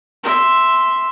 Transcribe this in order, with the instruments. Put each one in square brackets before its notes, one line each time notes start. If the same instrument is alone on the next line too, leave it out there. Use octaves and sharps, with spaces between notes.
[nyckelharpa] E5 C6